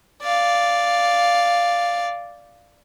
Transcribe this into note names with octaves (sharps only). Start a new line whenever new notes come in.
D5 F5